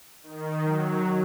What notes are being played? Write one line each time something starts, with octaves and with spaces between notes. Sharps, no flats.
D#3
F#3